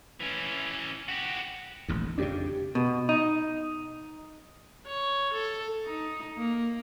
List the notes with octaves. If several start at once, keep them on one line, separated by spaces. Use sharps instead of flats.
E3 C#4
F#4 G4
D#1 A1 D#2
F2 C#3 D4 G4 D5
B2
D#4
C#5
A4
D#4
A#3